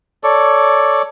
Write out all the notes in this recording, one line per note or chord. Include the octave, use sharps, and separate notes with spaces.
A4 C#5 D5